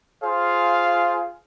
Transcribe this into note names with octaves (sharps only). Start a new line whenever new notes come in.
F4 G#4 C5 F5